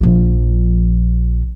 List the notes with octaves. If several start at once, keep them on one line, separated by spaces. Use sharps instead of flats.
A#1 F3